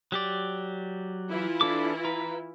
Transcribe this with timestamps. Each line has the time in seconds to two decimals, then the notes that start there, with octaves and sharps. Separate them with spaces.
0.12 F#3 G4 D5
1.29 E3 E4 F4
1.61 D4 A4 D6
2.05 B4 A#5